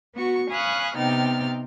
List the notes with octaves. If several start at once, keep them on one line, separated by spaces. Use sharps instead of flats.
B3 F#4 C#6
F5 G#5 B5 C#6 D#6 F#6
C3 B3 D#4 G5 F6 A6